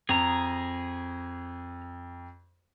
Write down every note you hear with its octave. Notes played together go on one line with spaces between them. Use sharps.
F2 G#4 A#5